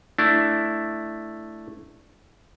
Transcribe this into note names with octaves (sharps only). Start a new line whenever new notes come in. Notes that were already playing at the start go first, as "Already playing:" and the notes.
A3 D4 E4